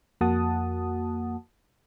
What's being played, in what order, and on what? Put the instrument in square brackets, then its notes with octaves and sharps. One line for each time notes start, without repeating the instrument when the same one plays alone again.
[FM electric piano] F2 A#3 F#4 F#5 A5 D#6